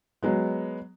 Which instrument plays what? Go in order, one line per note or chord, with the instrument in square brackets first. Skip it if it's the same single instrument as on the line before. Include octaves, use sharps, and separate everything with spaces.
[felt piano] F#3 G#3 B3